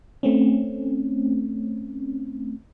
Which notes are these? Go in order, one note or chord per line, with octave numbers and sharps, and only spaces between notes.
A3 C4 C#4